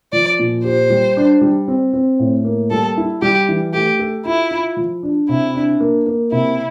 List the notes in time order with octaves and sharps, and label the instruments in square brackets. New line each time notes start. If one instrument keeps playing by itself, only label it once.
[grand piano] F3 [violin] D5
[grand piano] A#2
[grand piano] G4 [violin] C5
[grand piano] G3
D4
G3
C4
C4
A2
A#3
[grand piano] G3 [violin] A4
[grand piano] E4
[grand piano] G3 [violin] G4
[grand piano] E3
[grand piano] A3 [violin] G4
[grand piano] A4
[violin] E4 [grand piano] F4
[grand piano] F4
F3
D4
[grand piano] C3 [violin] E4
[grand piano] D4
A#3
A#3
[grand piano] C3 [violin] E4